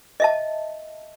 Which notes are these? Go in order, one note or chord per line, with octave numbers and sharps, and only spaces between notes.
D#5 E5 A5